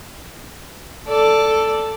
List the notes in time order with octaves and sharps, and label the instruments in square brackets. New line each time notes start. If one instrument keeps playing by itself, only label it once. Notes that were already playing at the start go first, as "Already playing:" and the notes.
[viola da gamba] A4 D5